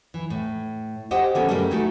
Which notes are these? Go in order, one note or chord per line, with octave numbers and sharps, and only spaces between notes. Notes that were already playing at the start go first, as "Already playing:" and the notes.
E3
A2
G4 C5 D#5 F#5 G5
D3 A#3 B3 C#4 G#4 A4
F#2 G3 A3 F#4 A#4 B4
A3 D#4 E4 F#4 G#4